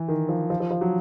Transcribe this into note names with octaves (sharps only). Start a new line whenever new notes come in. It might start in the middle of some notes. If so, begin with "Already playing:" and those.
Already playing: E3
D#3
F3
F3
F3
F3
F#3